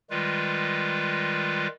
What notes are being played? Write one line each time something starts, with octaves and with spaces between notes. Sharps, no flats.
D#3 G3 G#3 F4 B4